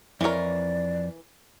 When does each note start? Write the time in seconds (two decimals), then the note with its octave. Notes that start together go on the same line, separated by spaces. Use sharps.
0.21 F2 E3 A#4 C#5 D5